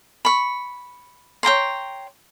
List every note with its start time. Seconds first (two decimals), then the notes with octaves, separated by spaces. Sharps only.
0.25 B5 C#6
1.43 C#5 G5 A#5 C6